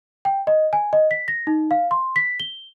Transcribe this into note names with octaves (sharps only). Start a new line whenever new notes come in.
G5
D#5
G#5
D#5
B6
A#6
D#4
F5
C6
B6
G7